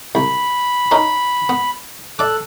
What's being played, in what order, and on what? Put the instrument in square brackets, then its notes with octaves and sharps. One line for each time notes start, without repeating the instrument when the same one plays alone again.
[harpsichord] C2 [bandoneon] B5
[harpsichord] C#4 D#4 A#4
B3
[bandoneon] A4 F#6 [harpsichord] D5 D6